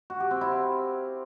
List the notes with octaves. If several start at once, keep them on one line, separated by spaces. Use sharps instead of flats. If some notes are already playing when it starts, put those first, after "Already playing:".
F#4
G4
C4
E4
F5